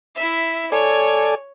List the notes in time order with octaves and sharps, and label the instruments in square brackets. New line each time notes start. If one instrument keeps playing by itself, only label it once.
[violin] E4 E5
[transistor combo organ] A4 D5 G#5 [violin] C#5